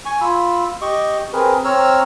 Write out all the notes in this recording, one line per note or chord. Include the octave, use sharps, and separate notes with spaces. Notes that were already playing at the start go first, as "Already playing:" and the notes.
G#5 C#6
F4 B5 E6
G4 D#5 C#6 D6
C4 G#4 A#4 B4
C4 C#5 A#5 E6 F6